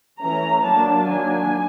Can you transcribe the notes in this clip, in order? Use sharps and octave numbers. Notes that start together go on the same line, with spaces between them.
E3 A3 C#4 A#5
F#3 A#3 D4 A5
D#3 F#3 A#3 D4 G#5